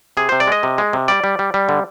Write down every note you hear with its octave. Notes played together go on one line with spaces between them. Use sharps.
C3 G#4
C3 C5
D5
G#3 D#5
C3
G#3
C3
G3 D5
G3
G3
G3
D3